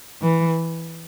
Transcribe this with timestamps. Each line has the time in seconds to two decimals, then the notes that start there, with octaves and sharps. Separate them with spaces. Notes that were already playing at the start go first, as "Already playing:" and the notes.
0.21 E3